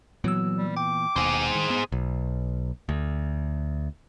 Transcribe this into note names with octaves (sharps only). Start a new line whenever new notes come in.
A#2 E3 F#3 B3 E6
G3
G5 D6
D#1 D#2 B2 G#4 C5
D#3
B3
B1
D2